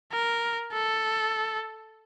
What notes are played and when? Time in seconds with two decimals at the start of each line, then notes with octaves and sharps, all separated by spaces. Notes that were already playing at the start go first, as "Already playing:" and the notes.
0.12 A#4
0.73 A4